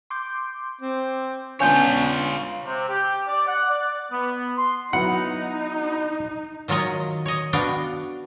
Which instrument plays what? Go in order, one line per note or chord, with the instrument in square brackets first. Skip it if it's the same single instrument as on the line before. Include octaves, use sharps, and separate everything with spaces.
[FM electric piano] C6 D6 G6
[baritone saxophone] C4
[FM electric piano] B3 C#4 F5 [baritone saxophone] D4 [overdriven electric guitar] F4 C#5 [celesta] G#5 G6
[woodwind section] C3
G4
D5
F#5
D5
B3
C6
[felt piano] F#3 B3 E4 [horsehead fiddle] D#4 [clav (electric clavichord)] F#5
[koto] D#3 F#3 F4 C#5 D#5
C#5 D#5
B3 D4 F#4 F5 G5